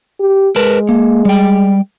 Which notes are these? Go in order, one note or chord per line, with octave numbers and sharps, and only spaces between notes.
G4
G#3 A#4 B4 A5
A#3
G3 G5